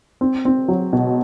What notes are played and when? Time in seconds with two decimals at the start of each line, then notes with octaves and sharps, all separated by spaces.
0.21 C4
0.45 C4
0.68 F#3
0.93 B2